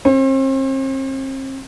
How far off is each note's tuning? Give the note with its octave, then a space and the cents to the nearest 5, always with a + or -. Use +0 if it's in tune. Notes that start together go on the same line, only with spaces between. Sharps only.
C4 +40